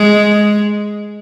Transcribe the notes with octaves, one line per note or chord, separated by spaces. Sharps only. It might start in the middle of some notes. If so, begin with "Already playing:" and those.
Already playing: G#3